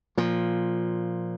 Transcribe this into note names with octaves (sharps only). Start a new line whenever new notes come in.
A#2 F3